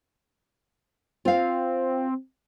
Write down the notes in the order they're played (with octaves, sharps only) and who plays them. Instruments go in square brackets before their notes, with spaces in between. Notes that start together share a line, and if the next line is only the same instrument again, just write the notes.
[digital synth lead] C4 [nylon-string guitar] F4 F5